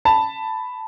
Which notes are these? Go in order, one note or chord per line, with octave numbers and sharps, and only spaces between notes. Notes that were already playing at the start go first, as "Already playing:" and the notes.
A5 B5